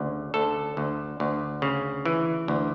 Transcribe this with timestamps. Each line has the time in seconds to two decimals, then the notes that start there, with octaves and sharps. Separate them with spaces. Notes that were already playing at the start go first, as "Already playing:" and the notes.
Already playing: D2 C#3
0.34 D2 A4
0.77 D2
1.20 D2
1.62 C#3
2.05 E3
2.48 D2